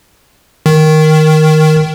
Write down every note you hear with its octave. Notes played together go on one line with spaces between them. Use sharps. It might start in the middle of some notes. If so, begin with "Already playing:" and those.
D#3